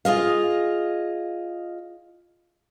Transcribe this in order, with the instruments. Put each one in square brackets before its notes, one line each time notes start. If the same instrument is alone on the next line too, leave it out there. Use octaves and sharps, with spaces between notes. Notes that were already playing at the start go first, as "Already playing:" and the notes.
[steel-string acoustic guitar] F4 G#4 D#5 F5